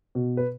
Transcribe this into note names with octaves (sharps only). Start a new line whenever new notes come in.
B2
B4